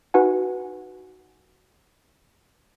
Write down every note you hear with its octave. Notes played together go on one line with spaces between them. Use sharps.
D#4 F#4 B4 F#5 G#5